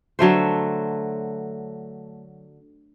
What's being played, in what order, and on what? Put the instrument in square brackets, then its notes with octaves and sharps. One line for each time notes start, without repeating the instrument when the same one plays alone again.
[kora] D3 F#3 A3 C5